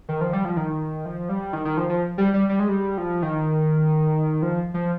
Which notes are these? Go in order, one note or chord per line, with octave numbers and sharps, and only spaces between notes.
D#3
F3
G3
F3
D#3
F3
G3
D#3
D#3
F3
F3
G3
G3
G3
G#3
G3
F3
D#3
F3
F3